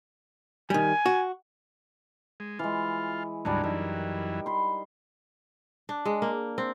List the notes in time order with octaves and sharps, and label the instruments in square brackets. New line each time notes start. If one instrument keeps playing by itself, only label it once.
[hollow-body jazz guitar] D#3 G3 [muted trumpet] G#5
[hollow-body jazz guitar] F#4
[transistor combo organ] G#3
[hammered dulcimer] E3 G#3 [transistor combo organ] F4
[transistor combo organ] D2 G#2 F#3 [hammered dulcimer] G3 D4 A#4
[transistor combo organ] F#2 E3 [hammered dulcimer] D#4 G5
[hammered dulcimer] B5 C6
[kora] D4
G#3
A#3
C4